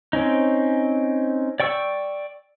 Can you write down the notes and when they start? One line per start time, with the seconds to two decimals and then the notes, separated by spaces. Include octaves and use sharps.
0.13 C4 C#4 D#4
1.60 D5 G5 C#6 E6